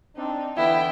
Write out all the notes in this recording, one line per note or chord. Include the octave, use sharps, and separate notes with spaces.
C4 D4 D#4
D3 E3 B3 E4 G5